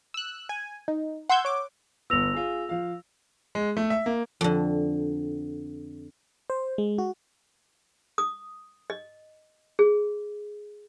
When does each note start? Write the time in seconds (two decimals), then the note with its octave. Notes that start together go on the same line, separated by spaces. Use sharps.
0.14 E6 F#6
0.49 G#5
0.88 D#4
1.29 F#5 C6 E6 G6 G#6
1.45 C#5 D6
2.10 G1 B3 E6 A#6 F7
2.34 F4 G#4
2.69 F3 F5
3.55 G#3
3.77 A3
3.90 E5
4.06 A#3
4.41 F2 D3
6.50 C5
6.78 G#3
6.98 F#4
8.18 D#6
8.90 D#5
9.79 G#4